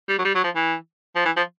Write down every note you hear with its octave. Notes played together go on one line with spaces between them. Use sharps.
G3
F#3
G3
F#3
F3
E3
F3
E3
F3